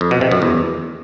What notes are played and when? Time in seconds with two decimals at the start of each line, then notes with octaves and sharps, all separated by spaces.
0.01 F2
0.11 B2
0.21 C3
0.31 F#2
0.42 E2